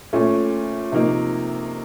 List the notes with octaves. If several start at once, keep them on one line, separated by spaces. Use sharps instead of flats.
A#2 A3 C#4
C3 F3 A#3 D#4